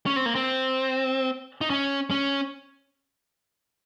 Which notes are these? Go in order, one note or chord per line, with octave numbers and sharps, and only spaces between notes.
C#4
C4
A#3
C4
D#4
C#4
C#4